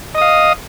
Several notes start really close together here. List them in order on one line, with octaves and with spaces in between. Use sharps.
D#5 D#6 F5